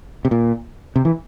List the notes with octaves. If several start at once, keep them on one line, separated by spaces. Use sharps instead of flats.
C3
A#2
C3
E3